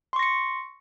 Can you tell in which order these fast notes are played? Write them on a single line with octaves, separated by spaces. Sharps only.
C6 C#6 A#6 C#7